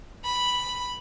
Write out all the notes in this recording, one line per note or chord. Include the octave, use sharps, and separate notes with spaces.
B5